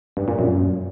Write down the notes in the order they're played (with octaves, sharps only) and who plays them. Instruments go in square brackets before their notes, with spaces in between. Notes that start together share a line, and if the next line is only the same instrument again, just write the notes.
[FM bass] G2
A#2
F#2